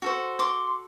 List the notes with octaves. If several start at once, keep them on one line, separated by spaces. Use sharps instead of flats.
F#4 A4 C5
C6 D6